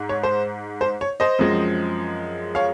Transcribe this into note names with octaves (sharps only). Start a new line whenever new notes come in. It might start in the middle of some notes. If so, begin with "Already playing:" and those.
Already playing: G#2 D#4
C#5
C5
C5
C#5
C5 D#5
F#2 F3 G#3 C4
C#5 F5